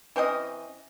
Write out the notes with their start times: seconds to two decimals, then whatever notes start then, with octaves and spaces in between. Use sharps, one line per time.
0.16 E3 C4 C#4 D#5